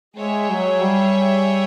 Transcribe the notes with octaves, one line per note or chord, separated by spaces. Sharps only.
G#3 G#4 C#5 E5 G5
F#3
G3